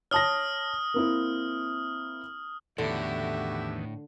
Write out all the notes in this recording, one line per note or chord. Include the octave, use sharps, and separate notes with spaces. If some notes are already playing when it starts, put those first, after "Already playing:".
C#5 A5 D#6 F6 A#6
A#3 C4 E4
E2 A2 D3 D#3 B3 F#4 G4 E5